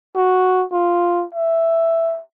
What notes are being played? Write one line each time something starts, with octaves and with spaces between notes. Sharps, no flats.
F#4
F4
E5